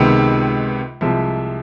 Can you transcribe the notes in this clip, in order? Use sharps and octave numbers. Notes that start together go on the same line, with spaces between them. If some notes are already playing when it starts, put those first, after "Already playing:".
Already playing: C#2 C3 D#3 G#3 B3
C2 C3 F3 G#3